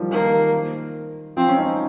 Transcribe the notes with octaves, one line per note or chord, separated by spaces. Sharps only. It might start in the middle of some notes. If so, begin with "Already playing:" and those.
Already playing: D#3 F3 G3
D#3 A#3
F3 C4
C#4
D#4